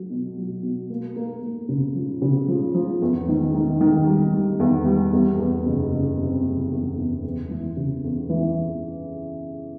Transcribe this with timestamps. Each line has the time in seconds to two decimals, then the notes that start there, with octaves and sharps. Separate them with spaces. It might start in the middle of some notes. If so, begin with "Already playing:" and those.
Already playing: F#3
0.10 B2
0.37 F#3
0.63 B2
0.90 A#3
1.16 A#3
1.43 A#3
1.68 C#3
1.95 F3
2.22 C#3
2.48 F3
2.74 F3
3.02 E2
3.28 D#3
3.54 D#3
3.81 D#3
4.07 G3
4.34 D#3
4.60 E2
4.86 G3
5.13 E2
5.39 E2
5.66 F#1
5.92 F#1
6.19 C3
6.44 F#1
6.71 E2
6.98 E2
7.24 E2
7.50 E3
7.76 C#3
8.04 E2
8.29 E3